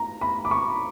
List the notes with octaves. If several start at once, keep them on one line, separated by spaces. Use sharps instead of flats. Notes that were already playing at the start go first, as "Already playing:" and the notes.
Already playing: A#5
B5
D6
C#6